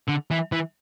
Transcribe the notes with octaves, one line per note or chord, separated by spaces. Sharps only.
D3
E3
E3